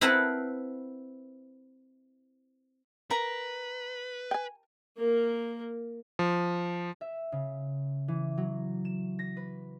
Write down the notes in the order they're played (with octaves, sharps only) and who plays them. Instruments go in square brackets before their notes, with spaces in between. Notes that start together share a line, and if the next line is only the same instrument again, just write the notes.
[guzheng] C4 E4 A#4 B4 F#5 A5
[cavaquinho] A#4 A#5 [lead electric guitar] B4
[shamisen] G5 G#5
[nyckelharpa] A#3 A#4
[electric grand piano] F3
[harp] E5
C#3
E3
F#3
E7
A#6
B4